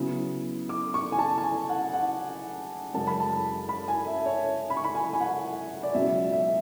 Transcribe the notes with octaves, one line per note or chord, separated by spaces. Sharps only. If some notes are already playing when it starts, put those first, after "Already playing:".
Already playing: C#3 F#3 B3 E4
D6
C#6
G#5
A5
A5
G#5
F#5
F#5
F#2 C#3 G#3 C#4 A5
B5
A5
B5
G#5
E5
C#5
B5
C#6
B5
G#5
G#5
F#5
D5
C#2 B2 F#3 C#4 E5
E5